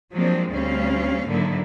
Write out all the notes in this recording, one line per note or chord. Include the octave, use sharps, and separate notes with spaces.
F3 F#3 G#3 A#3 C4 D4
D2 G3 C4 C#4 F5
G#2 D3 D#3 F#3 A#3 E4